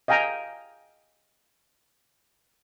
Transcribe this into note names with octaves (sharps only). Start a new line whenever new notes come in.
D#5 F5 G5 G#5 A#5